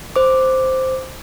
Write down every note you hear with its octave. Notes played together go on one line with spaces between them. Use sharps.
C5 D6